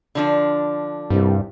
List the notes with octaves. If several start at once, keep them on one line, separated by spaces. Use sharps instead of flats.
D3 F3 D4
C2 G2